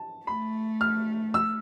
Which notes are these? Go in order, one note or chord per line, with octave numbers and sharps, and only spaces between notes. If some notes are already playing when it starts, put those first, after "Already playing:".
Already playing: A5
A3 B5
F6
E6